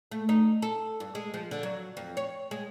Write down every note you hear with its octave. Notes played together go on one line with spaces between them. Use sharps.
A3
D#4
A4
G2
G#3
F3
D3
F#3
F2
C#5
G#3